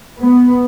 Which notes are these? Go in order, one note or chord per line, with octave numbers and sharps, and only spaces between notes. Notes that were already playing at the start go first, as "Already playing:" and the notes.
B3